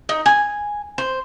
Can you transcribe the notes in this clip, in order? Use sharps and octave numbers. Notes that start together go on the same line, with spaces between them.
D#4
G#5
C5